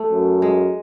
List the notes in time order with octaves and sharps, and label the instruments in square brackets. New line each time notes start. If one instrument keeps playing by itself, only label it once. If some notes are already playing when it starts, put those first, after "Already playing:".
Already playing: [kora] A3
[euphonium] F#2
[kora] G#3